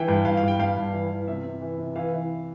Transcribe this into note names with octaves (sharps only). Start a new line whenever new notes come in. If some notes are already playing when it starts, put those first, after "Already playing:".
Already playing: E3 G5
G2
G2 F5
F5
G2 G5
G2 F5
G2
E3
E3
C3 E5
C3
E3
C3
E3 F5
E3